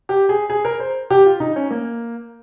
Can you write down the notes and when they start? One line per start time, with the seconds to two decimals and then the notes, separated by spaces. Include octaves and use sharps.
0.09 G4
0.29 G#4
0.50 G#4
0.65 A#4
0.80 C5
1.10 G4
1.26 F4
1.40 D#4
1.56 C#4
1.71 A#3